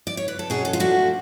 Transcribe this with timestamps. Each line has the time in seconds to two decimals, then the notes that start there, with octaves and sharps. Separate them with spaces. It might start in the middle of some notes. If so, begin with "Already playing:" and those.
0.07 D5
0.17 C#5
0.28 B4
0.39 A4
0.50 B2 F#3 C#4 G#4
0.65 A4
0.73 F4
0.80 F3 A3 D4 F#4